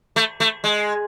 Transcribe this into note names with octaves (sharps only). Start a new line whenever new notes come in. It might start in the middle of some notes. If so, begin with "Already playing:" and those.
A3
A3
G#3